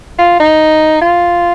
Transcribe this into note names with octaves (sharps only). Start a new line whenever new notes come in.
F4
D#4
F4